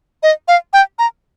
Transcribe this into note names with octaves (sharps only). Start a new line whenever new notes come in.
D#5
F5
G5
A#5